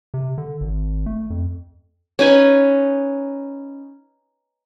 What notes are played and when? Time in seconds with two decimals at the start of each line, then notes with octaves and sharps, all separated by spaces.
0.14 C3
0.38 D3
0.61 G#1
1.06 A3
1.30 F2
2.19 C#4 D#4 B4 G#5